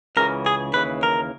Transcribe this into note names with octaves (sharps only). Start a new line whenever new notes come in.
C#2 C#3 E3 A#4
G#4
D#2 C#3 E3 B4
A#4